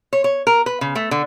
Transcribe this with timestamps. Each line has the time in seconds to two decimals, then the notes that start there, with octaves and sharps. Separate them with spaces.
0.13 C#5
0.24 C#5
0.47 A#4
0.66 B4
0.81 C#3
0.95 A3
1.11 D3